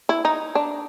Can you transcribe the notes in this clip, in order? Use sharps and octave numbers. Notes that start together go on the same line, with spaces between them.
E4
D#4
D4